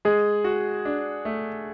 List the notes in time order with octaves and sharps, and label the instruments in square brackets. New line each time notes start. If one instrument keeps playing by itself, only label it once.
[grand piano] G#3 [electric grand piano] G#4
[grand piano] F#4
D4
A3